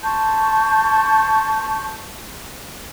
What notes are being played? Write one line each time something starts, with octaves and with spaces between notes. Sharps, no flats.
A5 C6 C#6 G6